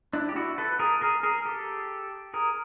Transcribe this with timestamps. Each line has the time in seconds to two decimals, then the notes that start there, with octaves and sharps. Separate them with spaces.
0.13 D4 E4
0.29 G4
0.36 E4 F#4
0.58 A4 B4
0.79 G#4 A#4
1.01 G#4 A#4
1.23 G#4 A#4
1.46 G4 A4
2.34 G#4 A#4